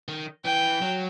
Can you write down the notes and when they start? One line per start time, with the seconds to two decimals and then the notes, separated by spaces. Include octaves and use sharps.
0.08 D#3
0.45 E3 G5
0.82 F#3